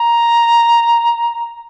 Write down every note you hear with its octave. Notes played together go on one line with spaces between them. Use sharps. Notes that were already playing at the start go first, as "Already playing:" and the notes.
Already playing: A#5